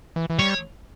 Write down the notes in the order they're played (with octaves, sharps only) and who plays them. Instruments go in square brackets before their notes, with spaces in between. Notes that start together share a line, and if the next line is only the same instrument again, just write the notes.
[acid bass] E3
E3
[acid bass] G3 [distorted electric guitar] C#5